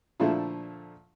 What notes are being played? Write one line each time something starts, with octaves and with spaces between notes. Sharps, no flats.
A#2 D3 F3 A3 E4